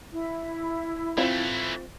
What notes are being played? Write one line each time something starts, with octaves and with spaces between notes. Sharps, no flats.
E4
E3 A3 C4 F4